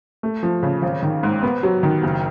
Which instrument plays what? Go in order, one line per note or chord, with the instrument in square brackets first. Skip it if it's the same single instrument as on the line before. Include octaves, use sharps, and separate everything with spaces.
[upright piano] A3
F3
C#3
G#1
D#3
G#2
B3
F#3
D#3
F#1